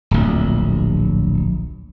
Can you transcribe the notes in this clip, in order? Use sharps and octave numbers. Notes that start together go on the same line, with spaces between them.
D1 A#1